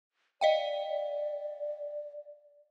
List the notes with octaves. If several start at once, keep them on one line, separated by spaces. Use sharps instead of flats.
D5 D#5 F5 G5